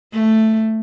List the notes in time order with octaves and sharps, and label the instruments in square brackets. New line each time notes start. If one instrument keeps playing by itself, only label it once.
[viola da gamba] A3